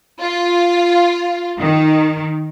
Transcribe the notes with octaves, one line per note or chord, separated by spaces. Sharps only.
F4
D#3